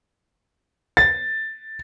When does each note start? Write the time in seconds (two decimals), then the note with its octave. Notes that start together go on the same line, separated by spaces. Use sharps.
0.97 A6